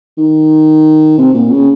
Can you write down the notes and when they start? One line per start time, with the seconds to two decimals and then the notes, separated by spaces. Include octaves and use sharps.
0.17 D#3
1.18 C3
1.34 A#2
1.51 C#3